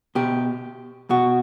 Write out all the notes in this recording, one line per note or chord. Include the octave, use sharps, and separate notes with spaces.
B2 G4
B2 F#4